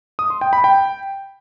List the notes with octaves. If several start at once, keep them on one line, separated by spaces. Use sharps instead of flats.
D#6
C6
G5
B5
G5